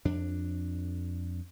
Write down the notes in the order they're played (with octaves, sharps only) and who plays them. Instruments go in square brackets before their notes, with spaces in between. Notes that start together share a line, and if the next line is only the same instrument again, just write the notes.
[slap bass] F2 D4